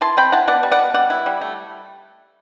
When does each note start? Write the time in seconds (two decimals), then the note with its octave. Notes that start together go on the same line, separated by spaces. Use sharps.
0.01 E4 A5 C6
0.17 C4 G5 B5
0.32 E4 F#5 A5
0.47 B3 D5 F#5
0.63 G3
0.71 D5 F#5
0.79 B2
0.94 G3 D5 F#5
1.10 E4
1.26 G3
1.41 A3